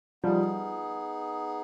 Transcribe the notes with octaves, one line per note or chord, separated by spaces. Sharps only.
F3 G3 B3 D#4 G#4